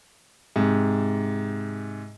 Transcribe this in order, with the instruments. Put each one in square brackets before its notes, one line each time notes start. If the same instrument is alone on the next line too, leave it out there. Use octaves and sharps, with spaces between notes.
[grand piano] G#2 C3